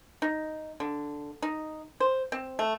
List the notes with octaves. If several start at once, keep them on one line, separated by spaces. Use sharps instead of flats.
D#4
D3
D#4
C5
C4
A3